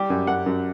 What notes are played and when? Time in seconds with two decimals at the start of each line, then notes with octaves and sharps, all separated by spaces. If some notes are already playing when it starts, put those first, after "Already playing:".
Already playing: G3 G4
0.10 F#2
0.27 F#2 F#5
0.46 F#2